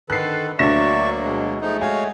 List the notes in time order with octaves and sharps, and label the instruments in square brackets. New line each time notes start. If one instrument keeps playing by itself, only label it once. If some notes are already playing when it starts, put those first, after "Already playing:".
[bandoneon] D3 D#3 [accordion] A4 B4 [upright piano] F#6 C7
[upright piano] D2 A#6 E7 [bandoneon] F#3 A#3 [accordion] D5 E5 C#6
[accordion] B2 G#3
[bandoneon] F3 D#4 [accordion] G#3 A3
[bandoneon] F#4 C#5 F5 [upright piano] G#5